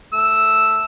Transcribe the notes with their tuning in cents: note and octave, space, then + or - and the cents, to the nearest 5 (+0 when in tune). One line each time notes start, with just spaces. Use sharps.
A3 +0 E6 +0